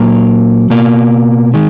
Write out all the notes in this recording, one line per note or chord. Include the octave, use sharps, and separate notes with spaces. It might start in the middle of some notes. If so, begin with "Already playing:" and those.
Already playing: A#2 F#3 A#3 A#5
B2 A#3
D#3 G#3